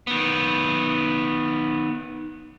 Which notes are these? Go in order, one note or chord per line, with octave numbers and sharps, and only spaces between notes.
D#3 B3